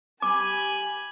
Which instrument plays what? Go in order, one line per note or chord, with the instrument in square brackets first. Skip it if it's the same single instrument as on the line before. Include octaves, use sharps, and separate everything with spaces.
[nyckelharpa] G4 B5 [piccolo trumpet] G#5 [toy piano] D6